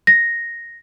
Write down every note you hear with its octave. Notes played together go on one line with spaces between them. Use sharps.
A#6